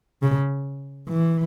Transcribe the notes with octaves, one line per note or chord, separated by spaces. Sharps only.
C#3
E3